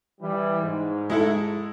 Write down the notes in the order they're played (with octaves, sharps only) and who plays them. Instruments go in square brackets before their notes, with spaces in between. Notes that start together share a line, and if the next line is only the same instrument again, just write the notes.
[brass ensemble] E3 G3
G#2
[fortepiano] G#3 E4 A4